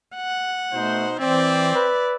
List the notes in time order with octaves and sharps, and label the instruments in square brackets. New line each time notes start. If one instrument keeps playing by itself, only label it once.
[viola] F#5
[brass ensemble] B2 D#4 C5 [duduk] A3
[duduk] E3 [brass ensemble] C4 [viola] D5 E5
[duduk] B4